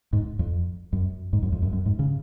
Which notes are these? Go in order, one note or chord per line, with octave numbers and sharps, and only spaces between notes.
G#2
F2
F#2
G#2
F#2
F2
F#2
F#2
G#2
C#3